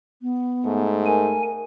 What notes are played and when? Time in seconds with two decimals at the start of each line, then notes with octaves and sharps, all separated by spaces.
0.22 B3
0.65 G#2 A3
1.06 A#4 G#5